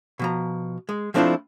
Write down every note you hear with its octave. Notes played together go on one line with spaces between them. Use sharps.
B2 F3 A#5
G#3
F3 A3 C4 D4 E4 F4